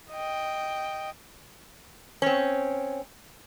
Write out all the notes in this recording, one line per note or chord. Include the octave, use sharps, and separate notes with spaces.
D#5 G5
C4 C#4